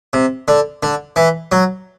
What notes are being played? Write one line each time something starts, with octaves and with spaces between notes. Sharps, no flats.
C3
D3
D3
E3
F#3